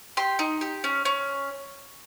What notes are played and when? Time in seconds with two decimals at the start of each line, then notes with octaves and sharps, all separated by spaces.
0.17 G4 C6
0.39 D#4
0.61 G4
0.84 C#4
1.05 C#4